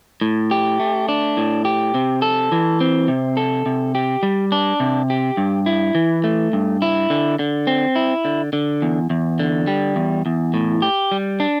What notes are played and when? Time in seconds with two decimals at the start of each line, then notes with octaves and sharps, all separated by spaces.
0.21 A2
0.51 G4
0.80 A3
1.09 D4
1.37 A2
1.65 G4
1.94 C3
2.22 A4
2.52 E3
2.80 C4
3.08 C3
3.37 A4
3.66 C3
3.95 G4
4.23 G3
4.52 D4
4.80 C3
5.10 G4
5.37 G2
5.66 E4
5.95 E3
6.24 A3
6.53 G2
6.82 E4
7.10 D3
7.39 D3
7.67 C4
7.95 E4
8.25 D3
8.53 D3
8.82 E2
9.10 E2
9.39 D3
9.67 G3
9.96 E2
10.26 E2
10.54 A2
10.82 G4
11.12 G3
11.40 D4